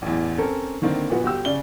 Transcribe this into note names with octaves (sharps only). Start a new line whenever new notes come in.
A1 E2
C4 C#4 A4 A#4
D3 D#3 A#3 C4 D4
A#2 F3 B3 F#4
G1 F#4 G4 E6
C#3 D5 G7